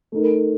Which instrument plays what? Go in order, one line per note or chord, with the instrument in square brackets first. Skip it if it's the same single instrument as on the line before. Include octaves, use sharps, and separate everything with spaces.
[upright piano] A3 D#4 A#4